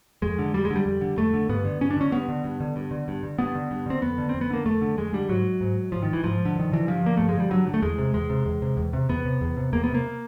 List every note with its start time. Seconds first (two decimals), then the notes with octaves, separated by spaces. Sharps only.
0.22 F2 G#3
0.39 D3
0.53 F2 G3
0.65 G#3
0.70 D3
0.75 G3
0.86 F2
1.01 D3
1.17 F2 A3
1.34 D3
1.49 G2 B3
1.65 D3
1.81 G2 C#4
1.91 D4
1.97 D3 C#4
2.12 G2 B3
2.29 D3
2.44 G2
2.60 D3
2.76 G2
2.91 D3
3.08 G2
3.23 D3
3.39 G2 B3
3.55 D3
3.71 G2
3.86 D3 C4
4.02 F2 B3
4.18 D3
4.29 F2 C4
4.41 B3
4.50 D3 A#3
4.65 F2 A3
4.81 D3
4.97 F2 G#3
5.13 D3 G3
5.29 G#2 F#3
5.61 G#2
5.92 G#2 F3
6.03 D#3
6.13 E3
6.24 G#2 F3
6.45 D3
6.56 G2 D#3
6.72 D3 E3
6.87 G2 F3
7.03 D3 A#3
7.17 G2 A3
7.29 G#3
7.35 D3 G3
7.51 G2 F#3
7.67 D3
7.74 A3
7.82 E2 G#3
7.98 C3
8.14 E2 G#3
8.30 C3
8.45 E2
8.62 C3
8.77 E2
8.93 C3
9.09 E2 B3
9.25 C3
9.41 E2
9.57 C3
9.73 E2 A#3
9.84 C3 B3
9.95 A#3